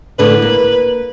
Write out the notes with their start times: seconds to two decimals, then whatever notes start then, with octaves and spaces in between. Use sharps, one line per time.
0.19 A2 D3 D4 B4
0.42 A#3